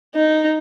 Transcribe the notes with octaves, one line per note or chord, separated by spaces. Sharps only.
D#4